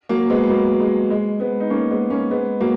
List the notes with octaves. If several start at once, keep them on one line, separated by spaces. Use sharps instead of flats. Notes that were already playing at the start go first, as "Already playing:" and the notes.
F#3 A#3
G#3 B3
F#3 A#3
G#3
G#3
G#3 B3
D#4
A#3 C#4
G#3 B3
A#3 C#4
G#3 B3
F#3 A#3